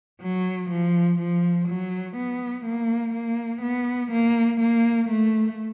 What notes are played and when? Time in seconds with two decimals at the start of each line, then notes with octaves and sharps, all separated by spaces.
0.22 F#3
0.70 F3
1.19 F3
1.69 F#3
2.17 B3
2.65 A#3
3.14 A#3
3.62 B3
4.12 A#3
4.61 A#3
5.09 A3